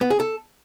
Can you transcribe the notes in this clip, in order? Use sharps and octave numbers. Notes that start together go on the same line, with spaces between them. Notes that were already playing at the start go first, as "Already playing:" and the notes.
B3
G#4
A4